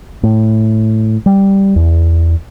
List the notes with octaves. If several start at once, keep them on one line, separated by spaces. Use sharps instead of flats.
A2
G3
E2